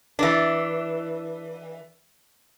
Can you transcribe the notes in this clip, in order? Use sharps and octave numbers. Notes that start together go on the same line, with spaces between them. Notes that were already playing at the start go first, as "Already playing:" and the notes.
E3 D4